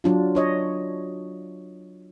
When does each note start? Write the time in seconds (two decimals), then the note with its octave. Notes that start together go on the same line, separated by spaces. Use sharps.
0.04 F#3 D4 F4
0.35 D4 C#5 D#5